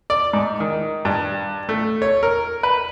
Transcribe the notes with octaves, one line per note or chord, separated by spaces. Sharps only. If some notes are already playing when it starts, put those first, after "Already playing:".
D5
G#2
D#3
G2
A3
C#5
A#4
B4